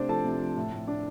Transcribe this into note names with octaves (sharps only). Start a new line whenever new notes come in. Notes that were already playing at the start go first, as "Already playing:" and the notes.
Already playing: C3 A3 C4 D4 C5 D5
F3 A4 A5
C3
F3
A2
A2
D4